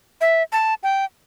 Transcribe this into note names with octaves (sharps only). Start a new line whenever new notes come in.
E5
A5
G5